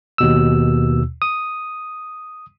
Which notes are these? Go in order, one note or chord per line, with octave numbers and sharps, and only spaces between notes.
D#2 B2 E6
D#6